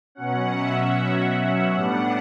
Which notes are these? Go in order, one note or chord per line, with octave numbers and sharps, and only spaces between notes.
B2 F#3 C#4 F#5
E5
A2 G3 B3 D4 F#5